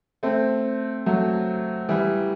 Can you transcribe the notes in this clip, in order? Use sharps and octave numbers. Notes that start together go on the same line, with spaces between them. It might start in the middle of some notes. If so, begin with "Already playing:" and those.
A3 C4
F#3 A3
E3 G3